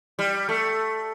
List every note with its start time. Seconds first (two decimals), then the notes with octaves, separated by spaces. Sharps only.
0.19 G3
0.49 A3